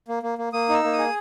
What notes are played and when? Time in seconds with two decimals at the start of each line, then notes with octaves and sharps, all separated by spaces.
0.08 A#3
0.23 A#3
0.38 A#3
0.53 A#3 D#6
0.69 D#4
0.74 E6
0.84 A#3
0.93 D#6
0.98 G#4